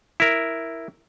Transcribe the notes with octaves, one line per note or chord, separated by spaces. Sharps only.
E4 A#4